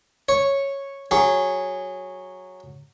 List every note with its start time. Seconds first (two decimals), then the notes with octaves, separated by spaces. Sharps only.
0.29 C#5
1.11 F#3 G#4